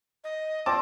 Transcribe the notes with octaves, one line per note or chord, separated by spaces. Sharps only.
D#5
C4 F4 D5 A5 D6